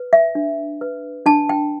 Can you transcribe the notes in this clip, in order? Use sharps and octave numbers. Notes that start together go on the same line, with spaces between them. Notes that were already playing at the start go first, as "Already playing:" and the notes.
Already playing: B4
E5
D4
B4
D4 A5
G5